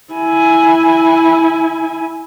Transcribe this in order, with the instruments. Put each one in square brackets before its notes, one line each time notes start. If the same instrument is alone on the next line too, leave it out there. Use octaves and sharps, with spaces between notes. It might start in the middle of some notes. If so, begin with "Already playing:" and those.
[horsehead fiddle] E4 G#5